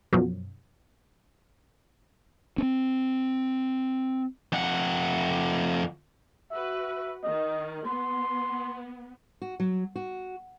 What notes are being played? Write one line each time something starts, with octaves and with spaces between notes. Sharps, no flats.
F#2 B2 F3 F#3
C4 C#4
F2 F#5
F#4 B4 E5
D#3 D#5
B3 C6
F#4
F#3
F#4